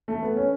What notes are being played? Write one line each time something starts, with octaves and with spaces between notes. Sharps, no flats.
A3
B3
C#4